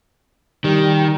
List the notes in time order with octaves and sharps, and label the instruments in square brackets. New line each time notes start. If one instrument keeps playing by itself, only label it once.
[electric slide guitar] D#3 [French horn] G3